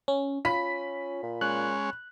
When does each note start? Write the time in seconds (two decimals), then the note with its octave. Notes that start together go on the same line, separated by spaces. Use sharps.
0.08 C#4
0.45 C#4 F4 B5 B6
1.23 A#2
1.41 G#3 C#4 F#6